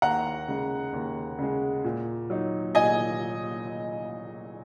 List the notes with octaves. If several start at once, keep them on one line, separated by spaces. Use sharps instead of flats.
D#2 F#5 A#5
C#3 G#3
D#2
C#3 G#3
A#2
F#3 D#4
A#2 D#5 G#5